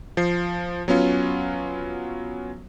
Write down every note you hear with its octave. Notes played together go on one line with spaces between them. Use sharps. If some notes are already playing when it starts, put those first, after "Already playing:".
F3 C7
F#3 B3 C#4 F4